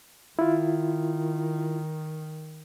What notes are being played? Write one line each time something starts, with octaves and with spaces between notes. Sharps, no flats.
D#3 E4 F4